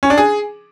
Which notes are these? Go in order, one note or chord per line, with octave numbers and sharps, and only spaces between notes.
C#4
D4
G#4